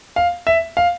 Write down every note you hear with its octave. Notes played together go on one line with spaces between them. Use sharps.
F5
E5
F5